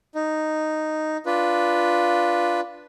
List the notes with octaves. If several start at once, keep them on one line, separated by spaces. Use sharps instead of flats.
D#4
D4 F4 B4